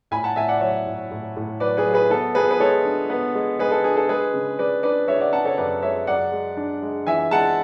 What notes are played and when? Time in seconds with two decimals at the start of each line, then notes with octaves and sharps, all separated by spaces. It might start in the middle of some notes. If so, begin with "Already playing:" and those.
0.11 A2 G#5 B5
0.24 F#5 A5
0.36 A2 E5 G#5
0.49 D5 F#5
0.61 F#3 C#5 E5
0.87 A2
1.11 A2
1.37 A2
1.60 F#3 B4 D5
1.77 G#4 B4
1.86 F#3
1.93 G#4 B4
2.10 B3 A4
2.35 B3 G#4 B4
2.51 B4
2.60 G#3 A4 C#5
2.85 D4
3.10 B3
3.35 G#3
3.59 G#3 G#4 B4
3.72 A4
3.84 D4 G#4
3.97 A4
4.09 G#3 G#4 B4
4.33 C#3
4.59 G#3 B4 D5
4.83 D4 B4 D5
5.08 G#3 C#5 E5
5.20 D5 F#5
5.33 C#3 F#5 A5
5.45 A4 C#5
5.58 F#2 B4 D5
5.82 G#3 C#5 E5
6.07 F#2 D5 F#5
6.32 G#3
6.57 D4
6.82 G#3
7.07 E3 E5 G#5
7.31 G#3 F#5 A5